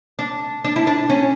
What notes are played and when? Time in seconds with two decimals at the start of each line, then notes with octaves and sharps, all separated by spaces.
0.19 D4
0.65 D4
0.76 E4
0.87 D4
1.10 C#4